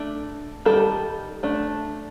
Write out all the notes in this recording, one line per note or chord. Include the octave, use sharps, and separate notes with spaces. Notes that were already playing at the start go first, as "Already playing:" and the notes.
Already playing: A3 D4
D#3 G3 A#3 A4
A3 D4